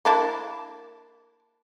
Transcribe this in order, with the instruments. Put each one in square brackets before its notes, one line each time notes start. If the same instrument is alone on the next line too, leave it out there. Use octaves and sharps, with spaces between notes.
[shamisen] A#3 D4 E4